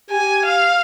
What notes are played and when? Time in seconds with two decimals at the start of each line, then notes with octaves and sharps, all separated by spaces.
0.10 G4 G#5
0.46 F5